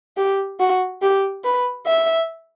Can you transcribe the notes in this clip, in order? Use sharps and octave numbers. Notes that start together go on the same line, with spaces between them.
G4
F#4
G4
B4
E5